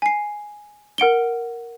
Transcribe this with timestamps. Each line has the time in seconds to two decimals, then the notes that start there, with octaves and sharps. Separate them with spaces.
0.02 G#5 C7
0.98 A#4 F#5 D7 G7